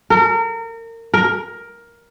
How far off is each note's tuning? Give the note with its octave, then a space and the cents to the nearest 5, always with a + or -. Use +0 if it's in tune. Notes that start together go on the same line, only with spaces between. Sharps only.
A#4 -30
A#4 +10